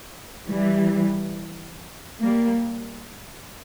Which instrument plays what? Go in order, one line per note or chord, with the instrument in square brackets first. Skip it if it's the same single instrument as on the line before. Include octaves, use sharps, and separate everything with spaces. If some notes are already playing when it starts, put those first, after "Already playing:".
[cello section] E3 G3
G3 A#3